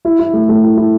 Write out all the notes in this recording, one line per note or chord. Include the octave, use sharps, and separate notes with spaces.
E4
E4
A3
A3
E4
E4